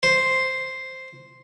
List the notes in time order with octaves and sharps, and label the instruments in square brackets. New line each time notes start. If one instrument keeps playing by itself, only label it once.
[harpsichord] C5